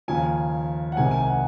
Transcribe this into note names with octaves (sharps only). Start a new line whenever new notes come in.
D#2 C#3 F3 G#5
F#5
C2 C3 D#3 G#3 G#5
G#5
F#5